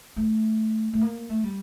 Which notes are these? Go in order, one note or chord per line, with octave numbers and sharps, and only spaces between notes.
A3
A3
A#3
A3
G3